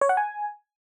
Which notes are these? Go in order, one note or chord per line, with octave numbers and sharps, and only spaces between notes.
C#5
F#5
G#5